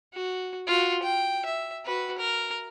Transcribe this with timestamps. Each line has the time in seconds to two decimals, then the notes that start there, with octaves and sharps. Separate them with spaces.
0.14 F#4
0.67 F4 F#4
1.03 G5
1.45 E5
1.85 F#4 B4
2.18 A#4